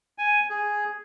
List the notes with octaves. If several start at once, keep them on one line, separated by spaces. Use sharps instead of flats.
G#5
G#4